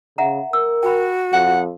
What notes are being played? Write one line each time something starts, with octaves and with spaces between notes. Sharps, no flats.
C#3 E5 F#5 A#5
A#4 E6
F#4 G5 B5
F2 F#5